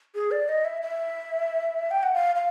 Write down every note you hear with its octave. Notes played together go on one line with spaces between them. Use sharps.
G#4
D5
D#5
E5
E5
G5
F#5
F5
F5